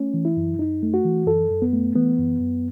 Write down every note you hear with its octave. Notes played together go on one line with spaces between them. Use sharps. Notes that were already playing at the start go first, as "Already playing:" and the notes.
Already playing: A3 C#4
E3
E4
F#2
F#2 D#4
A3
F#4
E3
F#2 A4
F#2
B3
A3
E3 B3
F#2
F#2